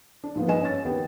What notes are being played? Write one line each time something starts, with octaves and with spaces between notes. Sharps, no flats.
D4
G#2 F3 A#3 B3
G2 G#4 B4 D#5 G#5 E7
C#4 C#5 A6
D#2 D#3 B3 G4 G5